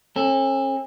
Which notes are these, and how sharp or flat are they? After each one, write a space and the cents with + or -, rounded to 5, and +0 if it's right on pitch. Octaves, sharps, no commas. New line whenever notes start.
C#4 -45 A4 +0